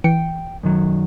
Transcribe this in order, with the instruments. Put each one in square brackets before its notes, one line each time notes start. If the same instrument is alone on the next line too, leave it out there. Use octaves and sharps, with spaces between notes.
[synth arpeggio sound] E3 C#7 [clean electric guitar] G5
[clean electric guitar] F#2 D#3 F#3